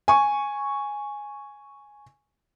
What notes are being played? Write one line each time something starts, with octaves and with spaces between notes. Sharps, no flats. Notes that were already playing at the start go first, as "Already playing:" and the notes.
G#5 C#6